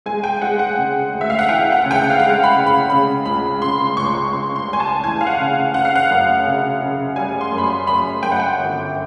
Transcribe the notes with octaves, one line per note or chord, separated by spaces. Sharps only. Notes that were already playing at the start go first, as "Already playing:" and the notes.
G#3 G#5
G5
G#3 F#5
F#5
C#3
D2
E5
F5
F#5
E3 G5
F#5
C#3
G5
F#5
F5
G#3 F#5
B5
C#3
B5
C#3 B5
C#2 B5
C#3 C6
C6
C#2 C#6
C#3 C6
C6
G3
G#5
A5
E3 G#5
F5
F#5
C#3
C#3 F#5
F5
F#5
F#2
C#3
C#3
G3 G#5
C6
F#2
B5
C6
F#2 B5
F#2 G5
F#5
G5
G1